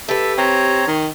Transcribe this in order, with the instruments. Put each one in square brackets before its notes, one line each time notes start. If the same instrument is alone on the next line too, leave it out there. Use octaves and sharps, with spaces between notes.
[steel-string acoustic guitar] G4 B4 [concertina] A4 E5
[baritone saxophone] C4 [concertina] C#5 A#5
[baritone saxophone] D#3